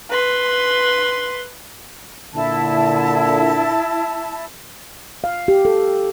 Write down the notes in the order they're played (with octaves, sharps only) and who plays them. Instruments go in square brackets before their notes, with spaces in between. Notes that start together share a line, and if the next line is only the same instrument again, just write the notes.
[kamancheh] B4 C6
[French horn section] A#2 D3 [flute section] E4 A5
[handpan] F5
G4
A4